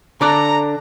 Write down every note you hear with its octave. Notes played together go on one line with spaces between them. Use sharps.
D3 D5 A5 A#5 D6 F#6